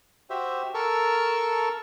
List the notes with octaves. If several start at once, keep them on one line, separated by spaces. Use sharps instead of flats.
F#4 G4 C5 E5
A4 A#4 A5 C#6 E6